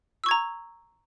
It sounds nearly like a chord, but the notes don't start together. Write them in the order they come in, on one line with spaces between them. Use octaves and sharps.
E6 C#6 G#6 A#5